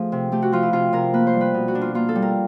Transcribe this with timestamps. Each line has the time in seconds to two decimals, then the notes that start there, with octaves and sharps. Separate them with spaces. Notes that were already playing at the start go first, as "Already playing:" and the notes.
Already playing: F3 A3 G#4
0.12 C3
0.32 A3 G4
0.42 F#4
0.52 F3 F4
0.63 E4
0.72 C3 F4
0.93 C3 A#4
1.13 A#3 B4
1.27 C5
1.34 G3
1.41 B4
1.54 B2
1.68 F#4
1.75 D4
1.81 F4
1.94 A#3 F4
2.09 A4
2.15 G3
2.22 A#4